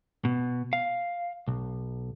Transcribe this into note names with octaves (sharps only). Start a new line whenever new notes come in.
B2
F5
B1